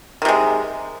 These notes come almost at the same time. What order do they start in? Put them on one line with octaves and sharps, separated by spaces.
D#3 C3 G#3